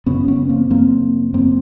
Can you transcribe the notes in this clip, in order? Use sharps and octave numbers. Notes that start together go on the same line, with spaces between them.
F#2 C#3 B3 C#4
B3 C#4
A#3 C4
F#2 C#3 A#3 C4
F#2 C#3 A#3 C4